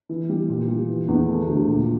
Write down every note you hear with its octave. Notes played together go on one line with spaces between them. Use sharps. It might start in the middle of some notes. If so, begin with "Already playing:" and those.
E3
G3
A#2
G3
E3
E2
A3
D2
A#2